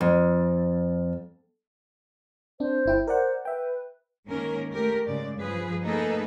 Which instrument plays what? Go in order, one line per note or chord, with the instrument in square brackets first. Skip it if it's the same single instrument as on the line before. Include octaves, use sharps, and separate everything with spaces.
[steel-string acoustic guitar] F2
[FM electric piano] C4 D4 [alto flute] C5
[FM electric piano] G1 E4 G5
[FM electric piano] A#4 D5 F#5 [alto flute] C5
[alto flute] B4 [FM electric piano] E5 G5
[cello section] G#2 D#3 A#3 C#4 A#4
A3 G4 A#4
G#2 C#3 G#3 D5
G2 F3 G#4 B4
A3 A#3 D#4 G#4 A4 B4